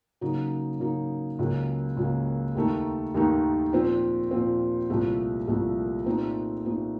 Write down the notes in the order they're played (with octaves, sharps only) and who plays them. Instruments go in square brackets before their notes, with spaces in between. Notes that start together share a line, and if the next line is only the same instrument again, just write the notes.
[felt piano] C#3 F#3 A#3 D#4
C#3 F#3 A#3 D#4
C#2 C#3 F#3 A#3
C#2 C#3 F#3 A#3
D#2 D#3 A3 D#4
D#2 D#3 A3 D#4
A#2 F3 C4
A#2 F3 C4
C2 A#2 F3 A3
C2 A#2 F3 A3
A#2 A3 C4 D#4
A#2 A3 C4 D#4